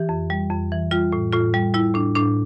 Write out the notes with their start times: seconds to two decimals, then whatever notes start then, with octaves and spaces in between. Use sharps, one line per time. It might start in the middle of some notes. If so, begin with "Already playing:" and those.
Already playing: E3 G4
0.09 F2
0.30 G3
0.51 F2
0.72 E3
0.91 G3 F4
1.12 A2
1.33 A2 F4
1.54 G3
1.74 G3 E4
1.94 A2 D4
2.15 A2 D4